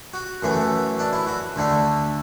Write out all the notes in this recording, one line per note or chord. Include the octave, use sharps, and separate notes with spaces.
F#4
F#2 E3 A3
D4
E4
F#4
D2 D3 A3